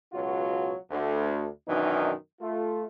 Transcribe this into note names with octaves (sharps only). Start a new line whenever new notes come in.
C#2 B2 F#3 F4 F#4
D2
F#2 B2 D#3 E3 D4 D#4
A3 F4